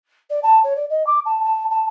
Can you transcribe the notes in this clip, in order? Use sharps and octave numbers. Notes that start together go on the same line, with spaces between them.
D5
A5
C#5
D5
D#5
D6
A5
A5
A5